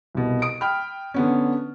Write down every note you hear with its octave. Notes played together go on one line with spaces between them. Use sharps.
C2 B2
D#6 D7
G5 B5 F6
D3 B3 C#4